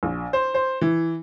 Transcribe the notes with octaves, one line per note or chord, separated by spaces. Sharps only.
A#1
C5
C5
E3